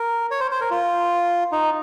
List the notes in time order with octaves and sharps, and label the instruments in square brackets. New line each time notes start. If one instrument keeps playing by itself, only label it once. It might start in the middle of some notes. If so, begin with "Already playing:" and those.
Already playing: [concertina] A#4
C#5
C5
C5
A#4
F4
D#4